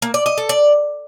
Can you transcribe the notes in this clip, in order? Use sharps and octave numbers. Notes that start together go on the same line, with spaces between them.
A#3
D5
D#5
A4
D5